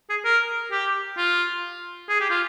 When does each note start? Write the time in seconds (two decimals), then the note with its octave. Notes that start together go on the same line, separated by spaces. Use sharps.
0.10 G#4
0.25 A#4
0.72 G4
1.17 F4
2.09 G#4
2.20 G4
2.30 F4